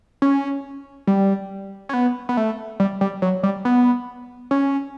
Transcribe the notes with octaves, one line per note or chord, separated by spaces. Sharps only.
C#4
G3
C#4
B3
B3
A3
G3
G3
F#3
G3
B3
C#4